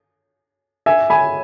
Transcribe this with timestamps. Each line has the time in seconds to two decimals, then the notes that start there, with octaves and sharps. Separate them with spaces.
0.86 E5 G#5
1.10 G#5 B5